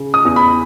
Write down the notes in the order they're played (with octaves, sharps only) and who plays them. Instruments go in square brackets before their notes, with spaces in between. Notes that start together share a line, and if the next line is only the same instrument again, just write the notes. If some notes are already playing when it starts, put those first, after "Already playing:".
Already playing: [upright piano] C#3
D#6
E2
B5